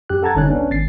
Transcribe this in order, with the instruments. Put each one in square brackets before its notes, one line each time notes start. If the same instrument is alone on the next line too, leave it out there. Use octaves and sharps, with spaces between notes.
[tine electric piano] F#2 G4 F#6
A4 F#5 A5 A#5 G#6 A6
G1 C2 D3 C#4 D#4 F#6
B3 C#4 D4
G#1 A6 C7